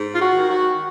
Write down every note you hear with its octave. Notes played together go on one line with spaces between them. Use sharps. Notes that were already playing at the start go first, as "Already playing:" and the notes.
Already playing: G#2
F4
F#4
D#3
F#4